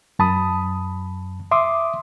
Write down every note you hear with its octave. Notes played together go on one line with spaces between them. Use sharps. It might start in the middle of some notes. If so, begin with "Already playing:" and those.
F#2 A5 B5 D#6
E5 C6 D6 D#6